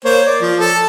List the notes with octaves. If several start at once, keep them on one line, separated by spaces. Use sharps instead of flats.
A#3 C5 C#5
D5
F3
A4